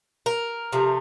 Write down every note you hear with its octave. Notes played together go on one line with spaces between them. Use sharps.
A#4
C3 F3 A3